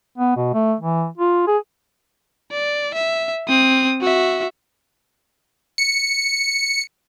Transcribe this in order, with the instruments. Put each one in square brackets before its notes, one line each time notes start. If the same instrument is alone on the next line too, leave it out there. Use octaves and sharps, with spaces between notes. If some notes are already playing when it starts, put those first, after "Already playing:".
[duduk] B3
B2
A3
E3
F4
G#4
[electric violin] D5
E5
C4 D#6
F#4 E5
[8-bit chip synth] C#7